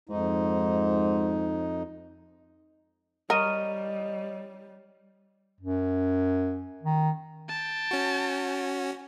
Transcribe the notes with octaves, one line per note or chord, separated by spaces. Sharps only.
F2 G#2 D#4
G3 A#4 C#5 D#5 F6 D#7
F#2
D#3
G5 A5
C#4 F#4